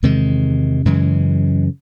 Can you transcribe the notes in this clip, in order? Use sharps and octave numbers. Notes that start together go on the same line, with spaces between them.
E2 C3 D#3 G#3
F#2 C#3 E3 G#3